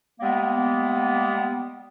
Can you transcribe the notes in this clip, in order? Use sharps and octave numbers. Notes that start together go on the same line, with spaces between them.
G3 G#3 A#3 B3